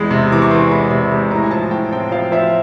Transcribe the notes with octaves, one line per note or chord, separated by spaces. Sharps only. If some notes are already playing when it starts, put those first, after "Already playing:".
Already playing: E2 G#3 B5
C3
E3 D6
C#6
E3 C6
G#3 B5
C3
G#3 B5
A2 A#5
G#5
F3 A5
A2 G5
C4 G5
F3 F5
F3 E5